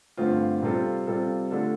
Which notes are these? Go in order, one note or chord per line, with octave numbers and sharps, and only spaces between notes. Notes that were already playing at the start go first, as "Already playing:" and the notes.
G2 D3 A3 C4 F4
C3 G3 C4 F4 A4
C3 G3 C4 F4 A4
D3 A3 D4 F4 A4